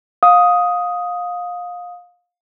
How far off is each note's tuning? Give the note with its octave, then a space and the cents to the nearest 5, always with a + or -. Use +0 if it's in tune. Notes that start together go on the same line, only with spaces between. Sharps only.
F5 +25 D#6 +5